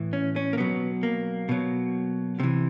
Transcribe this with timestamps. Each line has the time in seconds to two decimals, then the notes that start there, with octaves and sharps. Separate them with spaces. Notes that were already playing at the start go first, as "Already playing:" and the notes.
Already playing: A2 E3
0.13 C#4
0.36 C#4
0.53 A#3
0.57 B2 F#3 B3
1.03 A#3
1.49 B2 F#3
2.40 C3 E3